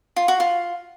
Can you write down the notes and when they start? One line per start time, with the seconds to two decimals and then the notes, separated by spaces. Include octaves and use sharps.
0.16 F4
0.28 F#4
0.40 F4